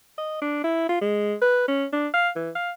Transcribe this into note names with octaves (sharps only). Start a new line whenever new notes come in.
D#5
D4
E4
F4
G#3
B4
C#4
D4
F5
E3
F5